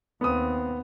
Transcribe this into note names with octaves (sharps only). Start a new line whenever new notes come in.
D#2 B3 C4 D#6